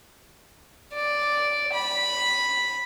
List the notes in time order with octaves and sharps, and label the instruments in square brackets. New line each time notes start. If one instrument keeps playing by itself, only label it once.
[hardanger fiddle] D5
B5